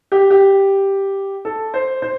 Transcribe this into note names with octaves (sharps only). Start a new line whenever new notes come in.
G4
G4
A4
C5
C5